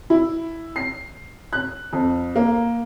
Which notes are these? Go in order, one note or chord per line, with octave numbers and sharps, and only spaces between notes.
E4
C7
F#6
F2
A#3